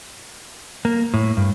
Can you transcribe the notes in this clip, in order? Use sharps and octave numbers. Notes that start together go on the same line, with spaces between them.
A#3
A2
G2